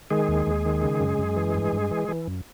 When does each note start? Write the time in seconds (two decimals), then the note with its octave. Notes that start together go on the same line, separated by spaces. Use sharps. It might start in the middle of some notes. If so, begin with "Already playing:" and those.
0.10 D#3 G#3 G#4
0.28 D#2
0.47 D#2
0.66 D#3
0.82 C#3
1.00 F#2
1.18 F#2
1.36 E3
1.54 G2
1.72 G2
1.91 E3
2.08 E3
2.27 F#2